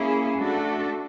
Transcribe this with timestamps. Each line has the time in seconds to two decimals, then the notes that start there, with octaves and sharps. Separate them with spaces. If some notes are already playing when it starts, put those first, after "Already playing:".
Already playing: A#3 C#4 E4 G#4
0.39 A3 D4 F#4 A4